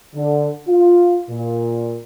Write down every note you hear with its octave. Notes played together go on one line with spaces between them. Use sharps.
D3
F4
A#2